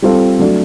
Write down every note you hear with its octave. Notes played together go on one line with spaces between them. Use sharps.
G3 C4 F4 A4
F#3 A3 D4